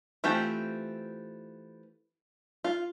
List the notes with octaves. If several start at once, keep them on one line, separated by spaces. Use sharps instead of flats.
E3 A3 C4 F4 G4
F4